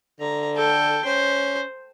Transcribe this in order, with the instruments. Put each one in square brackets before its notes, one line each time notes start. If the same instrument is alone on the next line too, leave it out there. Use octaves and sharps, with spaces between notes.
[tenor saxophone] D3 [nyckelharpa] A#5
[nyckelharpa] A4 G5
[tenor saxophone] C#4 [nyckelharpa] C5